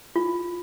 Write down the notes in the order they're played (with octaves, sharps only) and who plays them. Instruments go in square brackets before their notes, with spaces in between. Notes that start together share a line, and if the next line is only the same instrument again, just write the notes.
[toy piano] F4